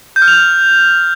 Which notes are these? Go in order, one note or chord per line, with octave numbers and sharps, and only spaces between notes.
G6
F6
F7
F6